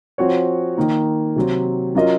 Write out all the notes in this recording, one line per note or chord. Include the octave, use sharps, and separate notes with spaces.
F3 C4 F#4 C#5
D#3 A#3 D#4
C3 F#3 C4
F#3 C#4 F4 A#4 D#5